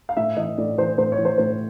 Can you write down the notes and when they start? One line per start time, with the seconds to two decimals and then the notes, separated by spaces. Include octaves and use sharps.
0.09 F5
0.17 A2 E5
0.37 E3 D#5
0.58 A2 D5
0.78 E3 C5
0.98 A2 C5
1.12 C#5
1.18 E3
1.25 C5
1.38 A2 C5